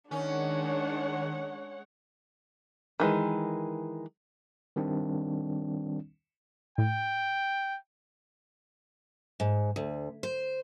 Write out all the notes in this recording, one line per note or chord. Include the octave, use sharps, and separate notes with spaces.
D#3 G#3 C#4 D4 C#5 F#5
D#3 E3 G#3
D#3 G3 C4 D4
A2 G5
G#2
D2
C5